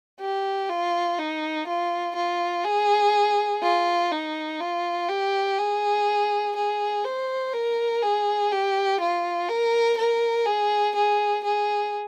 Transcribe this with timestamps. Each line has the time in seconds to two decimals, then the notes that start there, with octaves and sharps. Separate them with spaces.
0.20 G4
0.69 F4
1.19 D#4
1.67 F4
2.16 F4
2.65 G#4
3.62 F4
4.12 D#4
4.61 F4
5.09 G4
5.58 G#4
6.56 G#4
7.04 C5
7.53 A#4
8.03 G#4
8.52 G4
9.00 F4
9.49 A#4
9.97 A#4
10.46 G#4
10.95 G#4
11.44 G#4